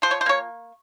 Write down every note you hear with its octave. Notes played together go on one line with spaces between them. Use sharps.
F3 C5
C#5
C5
A#3 C#5